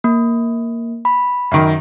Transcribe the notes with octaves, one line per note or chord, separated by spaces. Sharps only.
A#3
B5
F#2 D#3